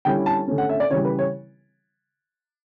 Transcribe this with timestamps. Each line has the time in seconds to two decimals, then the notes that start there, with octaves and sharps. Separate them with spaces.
0.05 D3 G3 C#4 E4 G5
0.26 A5
0.48 D3 A3 C#4
0.58 F#5
0.69 E5
0.80 D5
0.91 C#3 E3 G3 C#5
1.05 B4
1.19 C#5